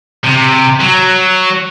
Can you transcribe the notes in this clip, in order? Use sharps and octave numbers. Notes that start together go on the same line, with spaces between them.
C3
F#3